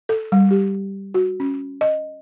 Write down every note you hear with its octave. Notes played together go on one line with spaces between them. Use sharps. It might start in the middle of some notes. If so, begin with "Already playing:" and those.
A4
G3
G4
F#4
C#4
D#5